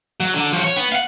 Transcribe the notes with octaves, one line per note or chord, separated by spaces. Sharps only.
F#3
D3
F3 F#4
C#5
B3
F5 F#5